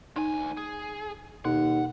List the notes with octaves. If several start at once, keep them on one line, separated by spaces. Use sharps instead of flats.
D2 D#4 G#5
G#4
D#2 B2 F#5